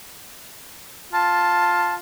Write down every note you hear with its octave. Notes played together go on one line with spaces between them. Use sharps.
F4 A5